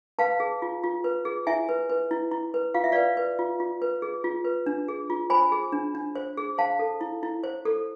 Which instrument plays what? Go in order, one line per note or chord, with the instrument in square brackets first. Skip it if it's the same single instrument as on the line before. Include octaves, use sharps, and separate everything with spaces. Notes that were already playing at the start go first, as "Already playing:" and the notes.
[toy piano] B4 F5 A5
G#4
F4
F4
B4
G#4
E4 E5 G#5
B4
B4
E4
E4
B4
F4 F5
E5
B4 D5 F5
B4
F4
F4
B4
G#4
F4
B4
D4
G#4
F4
C5 G#5 B5
G#4
D4
D4
C5
G#4
C5 F5 A5
A4
E4
E4
C5
A4